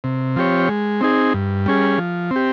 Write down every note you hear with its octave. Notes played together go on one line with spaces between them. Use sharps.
C3
F3 C4 G4 C#5
G#3
C4 D#4 G#4
G2
G3 C#4 G#4
F3
C4
G4